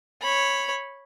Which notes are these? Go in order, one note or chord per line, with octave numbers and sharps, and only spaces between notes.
C#5 B5